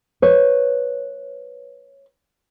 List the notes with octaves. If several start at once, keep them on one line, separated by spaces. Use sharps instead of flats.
B4 C#5